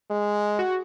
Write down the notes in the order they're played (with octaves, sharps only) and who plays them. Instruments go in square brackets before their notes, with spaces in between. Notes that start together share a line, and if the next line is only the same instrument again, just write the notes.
[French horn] G#3
[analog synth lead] F#4